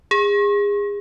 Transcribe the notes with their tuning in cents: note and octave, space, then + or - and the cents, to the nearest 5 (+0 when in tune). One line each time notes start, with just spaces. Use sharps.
G#4 -30